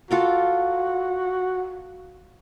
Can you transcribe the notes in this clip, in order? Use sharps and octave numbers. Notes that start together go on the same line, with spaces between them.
F4 F#4 A4 A#4